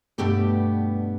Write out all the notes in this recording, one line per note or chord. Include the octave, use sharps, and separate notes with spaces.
G2 B2 A3 B3 G4 D5